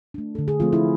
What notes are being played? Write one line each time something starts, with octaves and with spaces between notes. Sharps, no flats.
A3 D4
D3 A4
G#4
F3 A3 C4 F4
E4